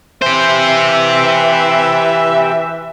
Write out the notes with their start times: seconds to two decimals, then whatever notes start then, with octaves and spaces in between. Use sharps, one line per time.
0.22 E3 G4 C5 E5